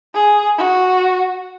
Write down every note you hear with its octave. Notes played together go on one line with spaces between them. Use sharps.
G#4
F#4